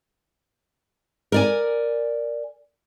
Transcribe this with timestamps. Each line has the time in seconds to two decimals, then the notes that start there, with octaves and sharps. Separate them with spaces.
1.32 A#4 D5 G#5